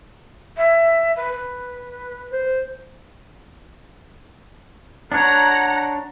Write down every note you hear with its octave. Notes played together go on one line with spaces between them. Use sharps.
E5
B4
B4
C5
D4 C#5 F#5 A#5